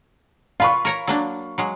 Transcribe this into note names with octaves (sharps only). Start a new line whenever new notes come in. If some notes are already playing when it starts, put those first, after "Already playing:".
F4 B4 F5 B5 C#6
A#4 C#5 A#5
F#3 A#3 D4
F#3 G#3